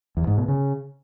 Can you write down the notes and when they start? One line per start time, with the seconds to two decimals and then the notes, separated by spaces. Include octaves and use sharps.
0.17 E2
0.27 G#2
0.38 B2
0.48 C#3